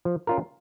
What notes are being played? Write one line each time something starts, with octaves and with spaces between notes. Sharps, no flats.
F3
C#4 F4 A#4